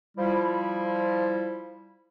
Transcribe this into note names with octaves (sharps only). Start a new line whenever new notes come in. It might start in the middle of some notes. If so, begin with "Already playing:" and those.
F3 G3 E4